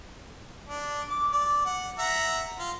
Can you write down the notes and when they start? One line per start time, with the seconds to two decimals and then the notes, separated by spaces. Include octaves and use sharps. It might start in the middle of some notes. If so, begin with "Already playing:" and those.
0.68 D4
1.10 D6
1.32 D5
1.66 F#5
1.99 E5 F#5 A#5
2.59 F4